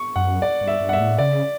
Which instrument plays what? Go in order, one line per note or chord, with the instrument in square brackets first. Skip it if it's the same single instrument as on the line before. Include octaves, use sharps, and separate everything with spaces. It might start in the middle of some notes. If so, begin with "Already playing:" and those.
Already playing: [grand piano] C#6
[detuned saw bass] F#2 [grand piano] F#5
[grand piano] D5
[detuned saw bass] G2
[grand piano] E5
[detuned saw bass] G2
[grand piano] F#5
E5
[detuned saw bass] A2
[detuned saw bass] C#3 [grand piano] D5